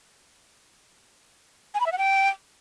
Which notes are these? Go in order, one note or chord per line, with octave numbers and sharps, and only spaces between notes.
G#5
B5
E5
F#5
G5